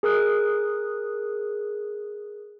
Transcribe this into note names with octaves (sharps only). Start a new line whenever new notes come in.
G#4 A#4 D#6 F#6